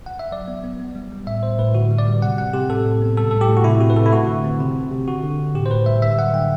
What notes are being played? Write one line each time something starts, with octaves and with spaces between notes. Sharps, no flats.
F#5
E5
F#3 D5
B3
B3
B3
G3
G3
A2 E5
A2 C5
A2 B4
D3 F#4
G3
D5
G3
C3 F#5
C3 F#5
C3 G4
A2 A4
A2
B3
G3 A4
A2 A4
G4
A2
F#4
C3 E4
C3 F#4
B4
C3 A4
E4
A3 F#4
D3
C4
C3
C3
C3
D3 F#4
D3
D3
A2 G4
C5
A2 B4
G3 E5
D3 E5
F#3 F#5
D3 G5